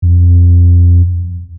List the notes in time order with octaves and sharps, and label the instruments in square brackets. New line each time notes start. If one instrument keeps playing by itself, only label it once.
[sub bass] F2